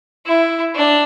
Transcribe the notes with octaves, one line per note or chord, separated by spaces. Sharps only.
E4
D4